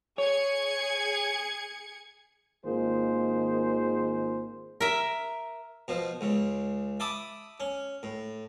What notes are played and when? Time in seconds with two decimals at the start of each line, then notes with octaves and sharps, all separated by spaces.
0.18 G#4 C#5 G#6 C#7
2.64 G#1 D#3 A#3 F4 G#4 C5
4.81 A#4 E5
5.88 B2 F3
6.21 C#2 C#3
7.00 E5 A5 B5 D6 D#6
7.60 C#4
8.03 A2